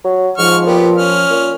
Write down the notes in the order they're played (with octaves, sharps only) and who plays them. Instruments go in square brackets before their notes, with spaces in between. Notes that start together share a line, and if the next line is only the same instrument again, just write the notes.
[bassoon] F#3
[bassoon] G#2 [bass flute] F3 [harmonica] C#6 F6
[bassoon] A#2 [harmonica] B3 G4
[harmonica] C#4 F6
[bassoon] A#2